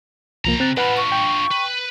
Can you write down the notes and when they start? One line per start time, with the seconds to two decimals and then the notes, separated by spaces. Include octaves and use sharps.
0.45 C2 C#3 F3 A#3 A#5
0.60 C4 F#6 A6
0.77 D4 F4 B4 F#5 B5
0.97 C#6
1.12 G5
1.51 B4